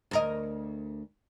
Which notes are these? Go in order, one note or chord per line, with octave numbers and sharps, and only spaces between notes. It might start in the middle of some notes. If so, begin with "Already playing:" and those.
D2 A#4 D#5